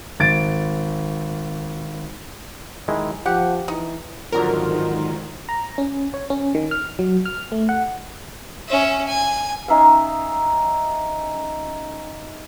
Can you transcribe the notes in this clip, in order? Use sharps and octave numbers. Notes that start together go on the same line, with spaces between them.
G#1 A6 D7
D#3 G#3 E4
F3 G4 F#5
E3 D#4
F2 G#2 D3 D#3 F#3 F4 A#4
A#5
C#4
C#5
C#4
D#3
F6
F#3
F6
A3
F#5
C#4 E5
G#5
C#4 D#4 E5 F5